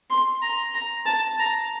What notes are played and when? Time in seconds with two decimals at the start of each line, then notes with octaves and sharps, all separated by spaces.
0.10 C6
0.42 A#5
0.74 A#5
1.06 A5
1.39 A#5